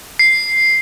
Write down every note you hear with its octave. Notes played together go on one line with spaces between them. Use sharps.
C7